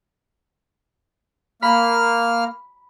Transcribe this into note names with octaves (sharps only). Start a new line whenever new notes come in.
A#3 B5 F6